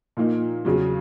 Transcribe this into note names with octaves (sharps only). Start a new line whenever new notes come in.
A#2 F3 A#3 D#4
E2 C#3 F#3